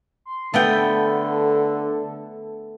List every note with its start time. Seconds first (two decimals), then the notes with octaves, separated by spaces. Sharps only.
0.25 C6
0.54 D3 A3 B3 A4 G5